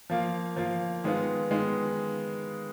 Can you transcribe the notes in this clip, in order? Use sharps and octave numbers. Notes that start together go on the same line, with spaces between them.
F3 A#3 F4
F3 A#3 F4
D#3 G#3 B3 F4
D#3 G#3 B3 F4